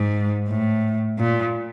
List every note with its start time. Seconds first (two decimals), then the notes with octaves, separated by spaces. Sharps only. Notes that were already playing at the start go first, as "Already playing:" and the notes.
Already playing: G#2
0.49 A2
1.19 A#2